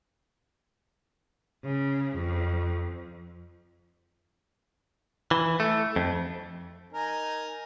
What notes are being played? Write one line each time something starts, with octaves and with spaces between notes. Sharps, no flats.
C#3
F2
E3
A3
F2
D#4 A#4 G#5